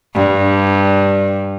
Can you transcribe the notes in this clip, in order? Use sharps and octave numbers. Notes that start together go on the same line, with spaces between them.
G2